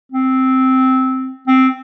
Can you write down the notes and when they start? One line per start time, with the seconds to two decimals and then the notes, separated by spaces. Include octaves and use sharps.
0.12 C4
1.48 C4